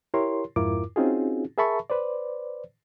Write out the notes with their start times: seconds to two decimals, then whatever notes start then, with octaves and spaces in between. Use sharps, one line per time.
0.14 E4 G4 A#4 C#5 C6
0.56 F2 G#2 E4 F4 A#4 D6
0.96 C4 C#4 D#4 F4 F#4 G#4
1.58 G#4 A#4 E5 A5 B5 C#6
1.90 B4 C5 D5